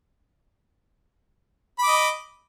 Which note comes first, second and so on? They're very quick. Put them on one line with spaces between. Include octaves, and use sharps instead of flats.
B5 D6 D#5